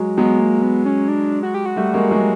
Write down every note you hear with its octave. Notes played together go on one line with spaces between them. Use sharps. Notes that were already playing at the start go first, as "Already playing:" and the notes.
Already playing: F#3 G#3
F#3 G#3 B3
A#3
B3
C#4
D4
F#4
G4
F#4
G3 A3
G#3 A#3
F#3 G#3